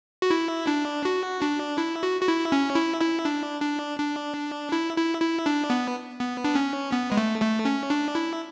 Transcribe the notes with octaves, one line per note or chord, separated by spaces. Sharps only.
F#4
E4
D4
F#4
D4
E4
F#4
F#4
E4
C#4
E4
E4
D4
D4
D4
E4
E4
E4
D4
B3
B3
D4
C#4
B3
G#3
A3
A3
C#4
D4
E4